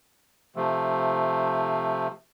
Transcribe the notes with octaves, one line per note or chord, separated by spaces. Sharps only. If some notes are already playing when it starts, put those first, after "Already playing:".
C3 F3 A3